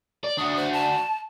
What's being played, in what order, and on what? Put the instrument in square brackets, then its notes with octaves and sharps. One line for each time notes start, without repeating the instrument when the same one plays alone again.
[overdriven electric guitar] D5
[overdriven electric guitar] D4 F#4 [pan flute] D#6
[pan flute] C5
A5